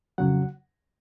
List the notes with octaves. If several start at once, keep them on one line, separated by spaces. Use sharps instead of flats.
F2 C#3 F#3 F#5